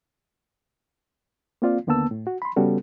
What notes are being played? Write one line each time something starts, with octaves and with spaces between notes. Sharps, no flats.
A#3 C4 F4 D5 F5
D#2 D3 A#3 B3 A5 E6
A2
F#4
B5 C6
C#3 G3 B3 C#4 F#4 A4